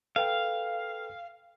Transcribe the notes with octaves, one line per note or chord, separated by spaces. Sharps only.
A4 B4 F5 G5